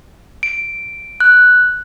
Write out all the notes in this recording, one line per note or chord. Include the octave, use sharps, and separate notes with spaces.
D7
F#6